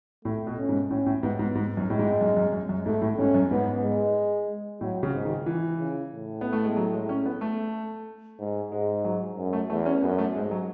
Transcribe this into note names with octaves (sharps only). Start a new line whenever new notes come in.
A2 A3
B2
C#4
G#2
A2 C#4
A2
G#2 B3
G#2
G#2
F#2
A2 G#3
G#2
F#2
F#2
F#2
F#2
G#2 A3
A2
G#2 C#4
F#2
G#2 B3
G#3
A2 F#3
C#3
G#2
D#3
E3
C#3
A2
B3
A3
G#3
F#3
G#3
C#4
B3
A3
G#2
G#2 G#3
F#3
F#2
A3
E2 A3
C#4
F#2 B3
A3
G#2 G#3
F#3